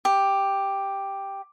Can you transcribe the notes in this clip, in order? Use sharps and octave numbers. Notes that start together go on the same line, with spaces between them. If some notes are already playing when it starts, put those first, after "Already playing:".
G4